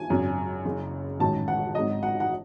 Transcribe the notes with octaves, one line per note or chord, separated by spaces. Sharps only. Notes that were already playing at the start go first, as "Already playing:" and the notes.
Already playing: G#5
G#1 F#2 C#3 F#3
F#1 F#2 C#3
A1 G#2 D#3 F#3 A5
F#5
G#1 G#2 F#3 D#5
F#5
F#5